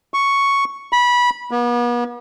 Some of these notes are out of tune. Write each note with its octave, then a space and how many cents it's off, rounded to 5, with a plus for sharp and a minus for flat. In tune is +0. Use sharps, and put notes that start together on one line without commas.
C#6 +0
B5 -20
B3 -40